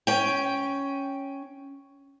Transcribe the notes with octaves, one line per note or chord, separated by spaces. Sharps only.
C#4 G5